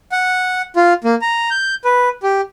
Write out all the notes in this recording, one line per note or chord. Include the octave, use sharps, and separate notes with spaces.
F#5
F4
A#3
A#5
G6
B4
G4